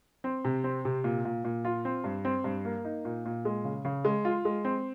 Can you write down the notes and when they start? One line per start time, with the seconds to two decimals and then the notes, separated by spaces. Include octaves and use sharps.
0.24 C4
0.44 C3
0.64 C4
0.85 C3
1.04 A#2
1.25 A#2
1.44 A#2
1.65 F4
1.85 C4
2.04 G2
2.25 C4
2.44 G2
2.65 A#3
2.85 D#4
3.05 A#2
3.25 A#2
3.45 G#3
3.64 C#3
3.85 C#3
4.05 G#3
4.25 F4
4.45 G#3
4.65 C4